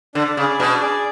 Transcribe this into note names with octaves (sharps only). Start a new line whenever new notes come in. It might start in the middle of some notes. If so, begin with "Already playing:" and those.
D3 D4
C#3 G#4 D5
B2 D4
G#4 D5